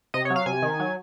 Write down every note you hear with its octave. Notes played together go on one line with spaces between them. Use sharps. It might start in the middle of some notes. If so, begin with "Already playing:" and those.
C3 D#5
C#5
F#3
F5
C3 G#5
D#3
F#3